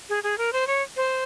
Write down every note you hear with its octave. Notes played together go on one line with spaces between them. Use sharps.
G#4
G#4
A#4
C5
C#5
C5